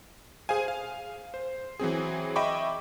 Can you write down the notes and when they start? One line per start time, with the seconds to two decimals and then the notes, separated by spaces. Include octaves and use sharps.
0.49 G#4 C5 F5 G#5
0.68 F5
1.34 C5
1.79 E3 F#3 C4 G#4
2.36 D#5 E5 G5 B5 C#6 D6